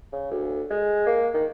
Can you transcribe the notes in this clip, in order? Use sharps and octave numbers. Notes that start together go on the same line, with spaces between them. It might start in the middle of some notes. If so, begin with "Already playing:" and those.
C#3
D2
G#3
A#3
D#3